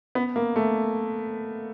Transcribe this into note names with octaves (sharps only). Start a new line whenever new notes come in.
B3
A#3
A3